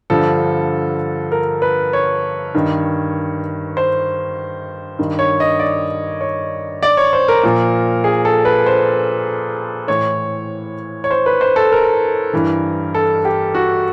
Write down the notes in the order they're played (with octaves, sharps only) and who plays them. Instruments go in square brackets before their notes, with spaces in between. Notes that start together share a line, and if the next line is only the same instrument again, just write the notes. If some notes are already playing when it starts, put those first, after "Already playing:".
[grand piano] G2 D3 F3 A4
A#4
B4
C#5
G2 D#3
C5
G2 D#3
C#5
D#5
D5
C#5
D5
C#5
C5
A#4
A#2 F3
G#4
A4
B4
C5
A2 E3 C#5
C#5
C5
B4
C5
A4
A#4
G2 E3
A4
G4
F#4